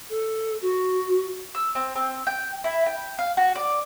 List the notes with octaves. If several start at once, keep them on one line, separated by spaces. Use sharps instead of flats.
A4
F#4
E6
C4
C4
G5
E4
G5
F5
F#4
D5